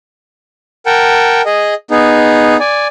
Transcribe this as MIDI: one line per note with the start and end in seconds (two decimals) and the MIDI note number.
0.86 1.42 70
0.86 1.42 78
0.86 1.42 79
0.86 1.42 81
1.46 1.74 68
1.46 1.74 75
1.91 2.57 59
1.91 2.57 63
1.91 2.57 68
2.60 2.87 74
2.60 2.87 80